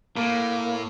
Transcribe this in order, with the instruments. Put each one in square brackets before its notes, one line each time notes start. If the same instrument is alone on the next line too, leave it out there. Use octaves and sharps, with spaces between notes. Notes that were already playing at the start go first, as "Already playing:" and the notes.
[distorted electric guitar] A2 [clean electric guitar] A#3